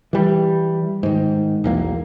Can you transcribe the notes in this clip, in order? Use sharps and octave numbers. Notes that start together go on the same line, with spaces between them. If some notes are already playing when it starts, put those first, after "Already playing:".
E3 G3
G#2 D#3
B1 E2 A#3